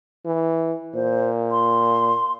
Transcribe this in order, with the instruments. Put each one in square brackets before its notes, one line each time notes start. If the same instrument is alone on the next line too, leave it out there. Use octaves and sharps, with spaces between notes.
[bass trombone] E3
[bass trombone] A#2 [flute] C5
[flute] C6